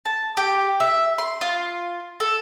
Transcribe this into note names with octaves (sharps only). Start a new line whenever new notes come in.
A5
G4
E5
C6
F4
A4